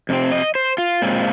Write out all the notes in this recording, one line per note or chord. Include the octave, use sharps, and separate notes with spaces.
F2 C3 C4
D#5
C5
F4
A#2 G#3 C4